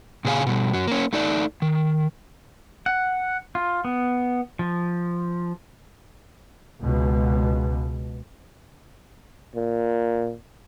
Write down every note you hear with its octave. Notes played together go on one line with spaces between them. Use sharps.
A#2 C#3 G#4 C5 F5 G#5
B2 G3
F#2 F#3
A#3 C#4
A3 D#4 D5
D#3
F#5
F4
B3
F3
C#2 B2
A#2